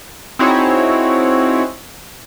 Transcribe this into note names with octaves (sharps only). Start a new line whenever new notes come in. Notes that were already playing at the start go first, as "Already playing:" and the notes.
C4 D#4 E4 F#4 G#4 C#5